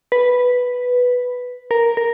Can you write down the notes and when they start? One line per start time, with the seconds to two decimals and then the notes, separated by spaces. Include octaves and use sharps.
0.12 B4
1.71 A#4
1.97 A#4